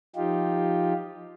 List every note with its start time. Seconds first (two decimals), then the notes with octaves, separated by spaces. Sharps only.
0.16 F3 D#4 F4 G4